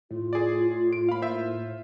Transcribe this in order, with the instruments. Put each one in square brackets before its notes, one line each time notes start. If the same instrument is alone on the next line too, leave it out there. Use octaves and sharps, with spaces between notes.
[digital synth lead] A2 [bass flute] F4
[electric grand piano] G#4 D5
D7
[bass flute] A#3 [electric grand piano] F5 B5
[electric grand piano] F4 C5 E5